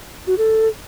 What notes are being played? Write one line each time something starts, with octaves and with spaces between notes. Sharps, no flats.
F#4
A4